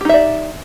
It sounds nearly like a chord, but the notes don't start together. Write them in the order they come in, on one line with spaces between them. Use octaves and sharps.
G4 D#4 E5 D5